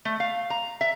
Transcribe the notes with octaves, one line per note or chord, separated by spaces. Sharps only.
A3
F5
A#5
E5